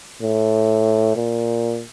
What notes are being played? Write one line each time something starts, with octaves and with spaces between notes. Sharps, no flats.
A2
A#2